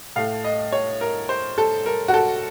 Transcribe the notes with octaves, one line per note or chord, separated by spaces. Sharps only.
A2 A3 F5
D#5
C#5
A#4
C5
A4
A#4
F#4
A4